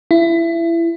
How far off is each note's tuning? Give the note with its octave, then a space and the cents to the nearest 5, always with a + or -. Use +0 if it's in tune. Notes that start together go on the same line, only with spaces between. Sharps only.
E4 +25